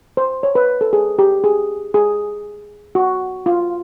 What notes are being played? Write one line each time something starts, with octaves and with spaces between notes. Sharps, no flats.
C5
C#5
B4
A4
G#4
G4
G#4
G#4
F#4
F4